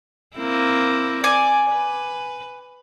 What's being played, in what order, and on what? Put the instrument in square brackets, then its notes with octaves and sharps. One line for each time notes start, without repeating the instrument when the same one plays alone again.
[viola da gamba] A#3 C4 E4
[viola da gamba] D5 [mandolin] G#5 D6
[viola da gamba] B4